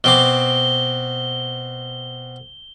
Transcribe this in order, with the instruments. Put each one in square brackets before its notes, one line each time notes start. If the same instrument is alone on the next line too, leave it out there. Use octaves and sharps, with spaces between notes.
[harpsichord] B2 C4 D6 [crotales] G7